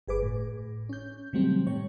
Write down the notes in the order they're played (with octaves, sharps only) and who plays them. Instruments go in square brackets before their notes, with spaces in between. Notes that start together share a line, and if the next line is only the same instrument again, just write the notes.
[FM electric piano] G1 G#4 B4 D6
A2
C#4 G6
C3 D#3 F#3 G3 A3 C4
A2 G3 C#5